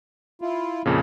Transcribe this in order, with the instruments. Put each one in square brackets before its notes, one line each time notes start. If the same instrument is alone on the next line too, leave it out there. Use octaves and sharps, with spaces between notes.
[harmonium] E4 F4
[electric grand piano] F2 A#2 C#3